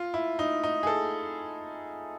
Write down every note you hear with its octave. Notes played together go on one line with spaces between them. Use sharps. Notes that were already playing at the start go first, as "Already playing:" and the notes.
Already playing: F4
E4
D#4
D#4
G#4
A4